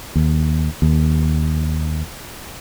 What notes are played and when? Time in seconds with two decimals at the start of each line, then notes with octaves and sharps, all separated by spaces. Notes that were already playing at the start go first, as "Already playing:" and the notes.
0.16 D#2
0.82 D#2